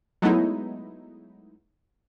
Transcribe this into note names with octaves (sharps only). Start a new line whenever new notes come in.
F#3 G#3 A3 B3 D#4 E4